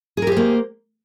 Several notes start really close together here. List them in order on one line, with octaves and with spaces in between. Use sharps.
G#4 A#4 G4 C5 A#3